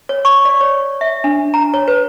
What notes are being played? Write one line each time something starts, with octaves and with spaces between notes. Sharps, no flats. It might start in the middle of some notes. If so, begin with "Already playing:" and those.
C#5
C#6
D5
C#5
E5
D4
A#5
C#5
B4